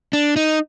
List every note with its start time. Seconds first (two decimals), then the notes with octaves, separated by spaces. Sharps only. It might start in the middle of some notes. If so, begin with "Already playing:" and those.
0.13 D4
0.36 D#4